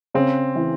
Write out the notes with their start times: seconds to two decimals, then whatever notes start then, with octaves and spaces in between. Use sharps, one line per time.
0.14 C#3 C4
0.56 E3